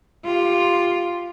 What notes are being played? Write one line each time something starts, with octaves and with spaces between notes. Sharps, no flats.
F4 G4